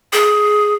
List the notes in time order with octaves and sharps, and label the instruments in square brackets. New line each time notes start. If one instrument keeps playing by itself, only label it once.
[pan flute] G#4